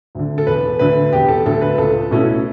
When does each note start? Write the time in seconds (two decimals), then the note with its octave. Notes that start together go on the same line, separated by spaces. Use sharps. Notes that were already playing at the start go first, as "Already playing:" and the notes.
0.15 D2 D3
0.38 A4
0.47 E1 B4
0.79 D2 D3 B4
1.13 E1 G4
1.28 A4
1.45 D2 D3 A4
1.62 B4
1.78 C#2 A4
2.11 B2 A3 C#4 E4